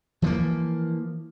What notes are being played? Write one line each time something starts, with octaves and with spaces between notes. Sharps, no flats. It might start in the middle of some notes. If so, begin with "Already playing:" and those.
E3 F3 A3 A#3